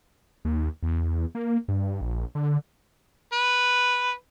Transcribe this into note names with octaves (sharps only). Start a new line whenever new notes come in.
D#2
E2
A#3
G2
A#1
D3
B4